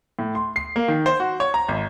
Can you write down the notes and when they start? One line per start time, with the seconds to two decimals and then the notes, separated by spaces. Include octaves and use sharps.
0.19 A2
0.35 C6
0.56 C7
0.76 A#3
0.88 D#3
1.06 C5
1.20 F#4
1.40 C#5
1.54 A#5
1.68 G#1